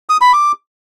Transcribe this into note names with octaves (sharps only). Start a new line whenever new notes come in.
D#6
B5
D6